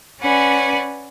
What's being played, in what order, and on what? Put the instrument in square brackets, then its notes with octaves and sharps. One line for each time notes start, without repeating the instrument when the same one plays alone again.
[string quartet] C#4 B4 D5 F#5 G#5